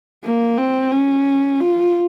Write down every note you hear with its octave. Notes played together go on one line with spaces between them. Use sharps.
A#3
C4
C#4
F4